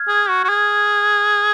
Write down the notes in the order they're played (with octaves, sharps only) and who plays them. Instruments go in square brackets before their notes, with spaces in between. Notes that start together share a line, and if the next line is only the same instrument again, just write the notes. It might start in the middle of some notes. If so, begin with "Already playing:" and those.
Already playing: [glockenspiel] F6 G#6
[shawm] G#4
F#4
F#4
G#4